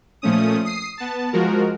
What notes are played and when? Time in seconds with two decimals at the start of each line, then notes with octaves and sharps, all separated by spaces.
0.22 A#2 F3 A3 C#4 D#6
0.65 D#6 C7
0.98 B3 A5
1.33 F3 G#3 F#4 A#4